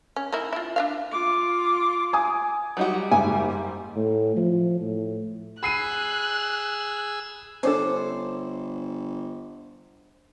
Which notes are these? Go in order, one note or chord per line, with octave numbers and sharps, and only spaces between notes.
C#4
A#3 D#4 E4
E4 F4
D4 E5 F5
F4 D6
G#5 D#6
F#3 G3 D#4 F#4
F#1 G#2 G#5
A2
F3
A2
G#4 B5 E6 F#6 C7 D#7
G1 C#4 D4 A4 C5